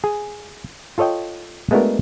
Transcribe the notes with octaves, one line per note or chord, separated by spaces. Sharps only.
G#4 G#5
F4 A4 C#5 D#5 G5
G#3 A3 B3 D4 F#4 A#4